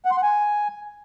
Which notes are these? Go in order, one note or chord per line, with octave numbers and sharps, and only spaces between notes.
F#5
C6
F#5
G#5